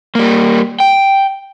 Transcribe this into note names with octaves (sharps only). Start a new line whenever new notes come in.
G3 A#3
G5